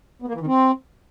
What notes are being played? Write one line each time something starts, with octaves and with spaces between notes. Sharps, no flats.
B3
A#3
E3
D#3
C4